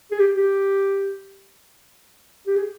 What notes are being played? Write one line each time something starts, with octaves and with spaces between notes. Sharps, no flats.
G#4
G4
G4
G4
G#4